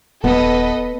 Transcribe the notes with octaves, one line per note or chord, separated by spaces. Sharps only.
D#1 B3 A4 B4 D#5